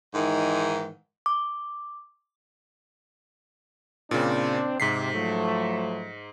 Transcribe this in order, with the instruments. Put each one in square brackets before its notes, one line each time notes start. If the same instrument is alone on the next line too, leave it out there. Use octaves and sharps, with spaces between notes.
[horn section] G#2 D#3 E3 G#3
[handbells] D6
[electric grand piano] A#2 C#3 [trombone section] C4 D4
[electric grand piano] G#2 B6 C7 [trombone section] C3
[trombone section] F3 F#3 A3